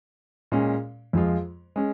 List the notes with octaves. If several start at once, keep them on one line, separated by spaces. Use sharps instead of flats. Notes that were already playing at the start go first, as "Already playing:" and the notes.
A#2 G#3 C#4
F2 F3 G#3 F4
G#3 C#4